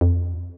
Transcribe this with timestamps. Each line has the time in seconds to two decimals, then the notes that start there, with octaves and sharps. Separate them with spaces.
0.01 F2